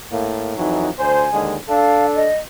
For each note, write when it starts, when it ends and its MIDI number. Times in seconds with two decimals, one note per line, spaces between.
0.11 0.55 45
0.11 0.55 58
0.57 0.89 41
0.57 0.89 52
0.57 0.89 54
0.57 0.91 63
0.99 1.27 38
0.99 1.27 72
0.99 1.47 80
1.33 1.57 39
1.33 1.57 50
1.33 1.57 56
1.69 2.27 62
1.69 2.27 69
1.69 2.06 77
2.16 2.35 75